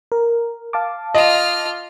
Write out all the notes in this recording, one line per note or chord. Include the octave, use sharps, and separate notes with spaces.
A#4
F5 A5 D6
F4 D#5 F6